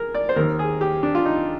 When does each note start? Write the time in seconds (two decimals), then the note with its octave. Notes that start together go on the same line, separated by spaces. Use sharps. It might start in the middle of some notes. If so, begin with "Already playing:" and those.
Already playing: G#4 A#4
0.15 D5
0.29 C5
0.36 D#2 D#3 A#4
0.59 G#4
0.81 G4
1.03 D4
1.15 F4
1.25 D#4